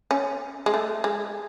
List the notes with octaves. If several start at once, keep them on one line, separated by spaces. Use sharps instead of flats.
C#4
G#3
A3
G#3